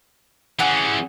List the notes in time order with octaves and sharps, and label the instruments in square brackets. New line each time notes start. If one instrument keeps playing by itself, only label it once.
[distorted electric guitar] E3 C#4 [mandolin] G#4 F#5